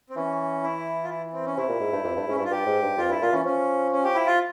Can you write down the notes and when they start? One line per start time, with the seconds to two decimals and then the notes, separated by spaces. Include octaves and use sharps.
0.10 C4
0.16 E3 C#4
0.63 E4
1.03 F4
1.10 E4
1.33 C4
1.46 C#4
1.57 C3 E4
1.68 A#2
1.80 G#2
1.92 G2
2.04 F2
2.16 G2
2.27 G#2 C#4
2.36 E4
2.39 G2
2.44 F4
2.50 G2 G4
2.66 G#2
2.82 G2
2.98 F2 F4
3.09 G2 E4
3.21 A#2 F4
3.33 E3 C#4
3.45 F3 C#4
3.92 C#4
4.04 G4
4.15 E4
4.27 F4